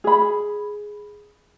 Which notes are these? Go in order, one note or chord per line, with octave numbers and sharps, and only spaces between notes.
G#4 B5